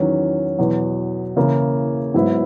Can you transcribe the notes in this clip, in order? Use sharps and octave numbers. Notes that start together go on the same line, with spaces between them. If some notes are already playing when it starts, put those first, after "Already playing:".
Already playing: E2 D#3 F#3 C#4
E2 B2 F#3
C#3 E3 A#3 E4
G#2 F#3 B3 E4